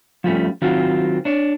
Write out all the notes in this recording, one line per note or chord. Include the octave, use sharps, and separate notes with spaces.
F3 G3 A3 C#4
D#3 F#3 C4 F4 F#4
D4 C#5